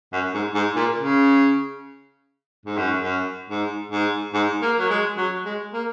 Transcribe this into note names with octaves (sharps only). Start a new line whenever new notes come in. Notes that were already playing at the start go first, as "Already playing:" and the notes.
F#2
G#2
G#2
A#2
C#3
G#2
F#2
F#2
G#2
G#2
G#2
A#3
F#3
G#3
F#3
G#3
A#3